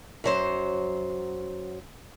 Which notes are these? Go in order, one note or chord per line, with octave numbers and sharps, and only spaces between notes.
F#2 F#3 C5